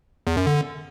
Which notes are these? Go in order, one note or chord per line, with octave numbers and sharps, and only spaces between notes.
E2
F#2
D3